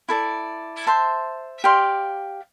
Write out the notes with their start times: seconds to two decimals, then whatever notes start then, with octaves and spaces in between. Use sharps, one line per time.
0.09 E4 A4 D5
0.87 C5 E5 A5 C6
1.64 G4 D5 F5 C6